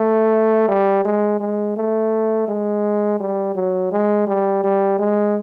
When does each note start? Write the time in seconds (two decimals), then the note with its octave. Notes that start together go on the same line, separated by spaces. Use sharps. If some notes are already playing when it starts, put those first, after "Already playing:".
Already playing: A3
0.69 G3
1.05 G#3
1.40 G#3
1.77 A3
2.48 G#3
3.20 G3
3.55 F#3
3.92 G#3
4.27 G3
4.64 G3
4.99 G#3